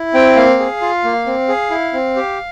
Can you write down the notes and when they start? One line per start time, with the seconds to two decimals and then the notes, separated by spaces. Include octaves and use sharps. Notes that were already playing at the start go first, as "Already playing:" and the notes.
Already playing: E4
0.14 C4 G5
0.36 A#3 F5
0.60 G#4
0.81 F4
1.04 A#3
1.26 C4
1.48 G#4
1.71 E4
1.93 C4
2.16 G4